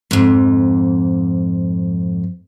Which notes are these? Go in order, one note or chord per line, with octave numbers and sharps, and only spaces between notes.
F2 G#2